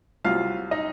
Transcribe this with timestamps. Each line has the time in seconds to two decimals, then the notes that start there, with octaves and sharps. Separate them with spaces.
0.24 C2 C3 F#3 F4 F5
0.71 D#4 D#5